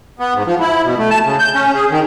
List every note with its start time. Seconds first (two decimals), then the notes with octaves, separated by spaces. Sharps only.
0.19 B3
0.34 G#2
0.46 F3
0.60 E4
0.84 B2
0.98 A3
1.10 A5
1.24 C#3
1.39 G6
1.54 C#4
1.75 G#4
1.91 D#3